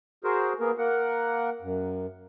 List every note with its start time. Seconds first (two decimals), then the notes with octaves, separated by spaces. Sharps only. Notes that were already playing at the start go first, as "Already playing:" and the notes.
0.24 F#4 G#4 A#4 C5
0.60 A#3 B3 G#4 A#4
0.78 A#3 A#4 F#5
1.62 F#2